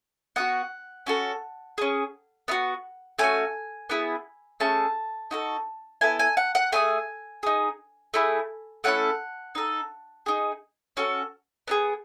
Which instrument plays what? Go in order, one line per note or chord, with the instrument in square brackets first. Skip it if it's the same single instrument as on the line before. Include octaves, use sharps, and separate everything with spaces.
[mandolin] B3 D#4 F#4 F#5
C#4 F#4 A4
C#4 G#4
B3 D#4 F#4
A3 C#4 F#4 G#5
B3 E4 G#4
A3 C#4 G#4 A5
D#4 F#4 A4
B3 E4 A4 G#5
G#5
F#5
F#5
A3 D#4 G#4 G#5
D#4 G#4
A3 E4 G#4
A3 C#4 E4 A4 F#5
D#4 A4
D#4 G#4
C#4 F#4 A4
B3 D#4 G#4